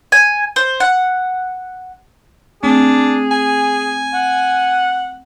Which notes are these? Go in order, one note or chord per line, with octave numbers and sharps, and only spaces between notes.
G#5
C5
F#5
A3 C4 D4 G#4
G#5
F#5